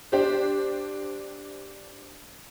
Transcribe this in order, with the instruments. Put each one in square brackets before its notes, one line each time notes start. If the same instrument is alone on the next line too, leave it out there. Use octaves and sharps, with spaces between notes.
[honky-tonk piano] D4 G4 C5